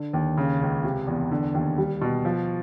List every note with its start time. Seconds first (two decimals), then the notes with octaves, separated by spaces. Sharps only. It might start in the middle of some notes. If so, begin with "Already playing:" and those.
Already playing: D3
0.13 D#2
0.37 C#3
0.61 C#2
0.84 C3
1.07 E2
1.31 D3
1.54 D#2
1.78 G3
2.01 B2
2.25 F3